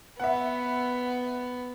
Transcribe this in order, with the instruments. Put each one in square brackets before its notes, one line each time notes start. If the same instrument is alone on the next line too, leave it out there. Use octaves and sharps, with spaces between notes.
[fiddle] B3 [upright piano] E5 F#5